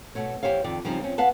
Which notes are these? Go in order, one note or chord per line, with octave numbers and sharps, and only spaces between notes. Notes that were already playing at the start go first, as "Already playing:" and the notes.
B2 A3 C#5
E2 D#3 G4 C5 C#5 F5
F2 D#3 D5
C#3 F3 G3 C4 C#4 D#4
F3 C4 C#4
B3 F5 F#5 A5